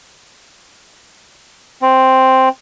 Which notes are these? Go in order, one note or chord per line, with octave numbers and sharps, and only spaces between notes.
C4